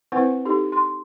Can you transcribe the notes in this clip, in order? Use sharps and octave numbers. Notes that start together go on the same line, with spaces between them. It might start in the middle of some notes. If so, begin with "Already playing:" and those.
C4 E4 B4 C5 F#5
D#4 G4 A4
C6